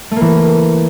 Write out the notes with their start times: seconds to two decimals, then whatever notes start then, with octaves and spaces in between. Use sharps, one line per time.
0.11 A3
0.16 A#3
0.21 E3